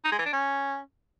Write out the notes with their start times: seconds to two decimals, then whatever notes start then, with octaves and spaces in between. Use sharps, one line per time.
0.05 D#4
0.12 G#3
0.19 E3
0.26 D4
0.33 C#4